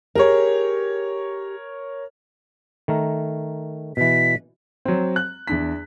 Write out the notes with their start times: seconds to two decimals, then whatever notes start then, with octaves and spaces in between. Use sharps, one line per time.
0.15 G4 G#4 A#4 C#5
2.88 D#3 A3 A#4
3.97 B2 E3 B6
4.85 F#3 C4
5.16 F#6
5.48 E2 D4 B6